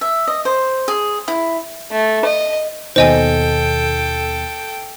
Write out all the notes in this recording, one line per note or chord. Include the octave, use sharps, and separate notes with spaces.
E5
D#5
C5
G#4
E4
A3
D#5
D#2 B2 D#3 A4 C5 D#5 G5 G#5